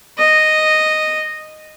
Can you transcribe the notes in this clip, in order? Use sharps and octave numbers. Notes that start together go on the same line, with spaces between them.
D#5